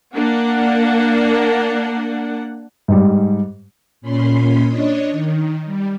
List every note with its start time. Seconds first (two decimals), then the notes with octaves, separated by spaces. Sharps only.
0.15 A#3 D4 F#5
2.88 G#2 G3
4.01 A#2 C#4 B5 C6
4.68 D4 C#5 D#5
5.11 D#3
5.65 G3